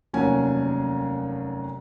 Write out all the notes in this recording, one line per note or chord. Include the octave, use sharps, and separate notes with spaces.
F1 D#2 F#3 C#4 G#5